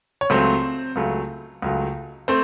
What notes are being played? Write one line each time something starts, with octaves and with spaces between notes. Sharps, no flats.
C#5
C#2 C#3 F#3 A3 C4 C5
C#2 C#3 F#3 A3
C#2 C#3 F#3 A3
A3 C4 C5